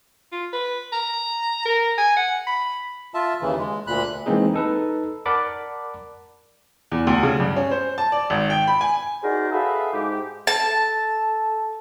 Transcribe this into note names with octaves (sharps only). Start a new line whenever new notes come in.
F4
B4
A#5
A#4
G#5
F#5
B5
F4 E5 A5
D#2 C#3 E3
G#3
D2 A#2 B5 F#6
E3 G#3 A#3 C4 D#4 G#4
D#4 A4 B4
A#4 D5 F#5 A5 B5 D6
E2
D2
C#3
G2
C#4
C5
A5
D5
G#1
G5
B5
G#5
D#4 F#4 G#4 A#4 C5 D5
F#4 G#4 A4 B4 E5 F5
G#2 G4
A4 A5